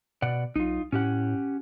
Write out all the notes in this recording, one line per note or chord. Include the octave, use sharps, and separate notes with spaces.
B2 D5 F#5
B1 D#4 F4
A2 C#4 G4 F#5